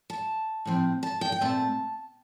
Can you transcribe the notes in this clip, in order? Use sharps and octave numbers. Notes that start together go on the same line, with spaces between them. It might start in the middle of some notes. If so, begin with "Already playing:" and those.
A5
A2 F3 C4
A5
G5
G5
A#2 A3 C4 A5